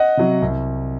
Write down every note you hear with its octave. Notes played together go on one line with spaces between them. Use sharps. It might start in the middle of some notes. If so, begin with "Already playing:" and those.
Already playing: D#5 F#5
C3 F#3
C2